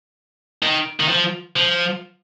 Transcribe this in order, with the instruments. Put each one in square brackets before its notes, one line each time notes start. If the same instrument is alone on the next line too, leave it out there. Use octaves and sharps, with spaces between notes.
[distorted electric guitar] D#3
D#3
F3
F3